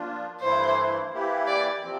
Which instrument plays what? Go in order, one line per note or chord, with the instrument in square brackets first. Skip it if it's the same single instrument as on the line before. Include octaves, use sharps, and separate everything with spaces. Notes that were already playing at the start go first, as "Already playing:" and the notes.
Already playing: [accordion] F3 A#3 D4 F4
[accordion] G2 E3 A3 E4 [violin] C5
[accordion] E3 A#3 E4 G4
[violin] D5
[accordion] C3 F3 C4